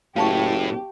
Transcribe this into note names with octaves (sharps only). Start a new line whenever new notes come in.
F#1 A2 G4 F5 A5 C#6